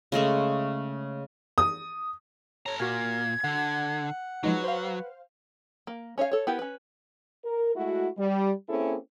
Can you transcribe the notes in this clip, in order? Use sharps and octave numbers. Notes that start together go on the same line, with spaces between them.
C#3 G#3 A3 C#4
D#6
A4 C#5 A#5
A#2 F#4 A#4 F6 G#6
D3 F#5
F3 F#3 G#3 D#4 B4
C5 F5
A#3
C#4 C#5 D#5 F5
A4 C#5
B3 E4 G4 A#4 B4
C#4 B4
A#4
G#3 A3 E4 F#4
G3
A#3 C4 C#4 E4 G#4 A4